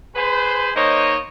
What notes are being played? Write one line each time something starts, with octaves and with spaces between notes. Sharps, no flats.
G#4 B4 C5
A#3 D#4 C5 C#5 D#5